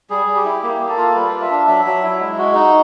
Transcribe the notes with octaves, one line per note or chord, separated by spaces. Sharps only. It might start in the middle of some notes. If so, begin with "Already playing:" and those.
G3 G#4
G3
G4
E4
A#3 G4
A#3
A4
F4
G3 B4
F4
E5
D4
F#3 E5
F#3
E4
G#3
F#4
D#4